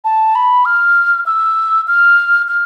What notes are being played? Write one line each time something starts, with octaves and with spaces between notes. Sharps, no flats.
A5
B5
F6
E6
F6
F6